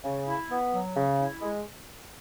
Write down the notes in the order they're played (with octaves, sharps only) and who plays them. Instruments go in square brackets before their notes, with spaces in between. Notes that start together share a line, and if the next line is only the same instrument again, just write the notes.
[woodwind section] C#3
E4
B3
F#3
C#3
E4
G#3